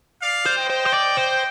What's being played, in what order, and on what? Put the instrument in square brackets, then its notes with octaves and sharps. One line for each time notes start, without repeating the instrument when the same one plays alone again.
[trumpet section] D5 F5
[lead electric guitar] C5
[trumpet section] D#5 G5
[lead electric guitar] C5
C5
D5
C5